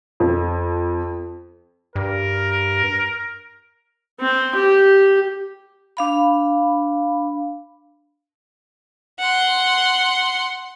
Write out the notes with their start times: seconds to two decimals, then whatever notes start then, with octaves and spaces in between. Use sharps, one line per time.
0.20 F2
1.96 G2 A#4
4.20 C4
4.55 G4
5.97 D4 F5 B5
9.20 F#5 C6